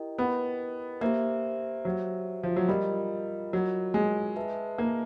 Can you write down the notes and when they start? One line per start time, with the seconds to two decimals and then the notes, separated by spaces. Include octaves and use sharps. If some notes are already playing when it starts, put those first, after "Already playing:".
Already playing: E4 G4 A#4 D#5 G5
0.18 B3
1.01 A#3 G4 C5 E5
1.85 F#3
2.43 F3
2.56 F#3
2.69 G3 F4 A#4 D#5
3.53 F#3
3.94 G#3
4.36 G#4 B4 E5 A5
4.78 A#3